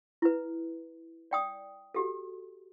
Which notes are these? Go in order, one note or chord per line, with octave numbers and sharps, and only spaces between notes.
E4 B4
D5 G5 D#6
F#4 G4 A4